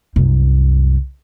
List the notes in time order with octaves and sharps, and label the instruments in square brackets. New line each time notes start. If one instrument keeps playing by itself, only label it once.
[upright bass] C2 F#2